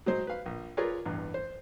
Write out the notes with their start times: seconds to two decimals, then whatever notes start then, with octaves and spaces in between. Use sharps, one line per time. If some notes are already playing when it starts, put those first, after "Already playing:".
0.06 F#3 G#3 C5
0.27 B4 F5
0.46 A#1
0.77 F4 G#4 A#4 B4 C#5 D5
1.05 A1 E2 G2
1.34 C5